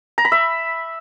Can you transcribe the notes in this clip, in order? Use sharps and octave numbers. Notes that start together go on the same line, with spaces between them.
A#5
B5
E5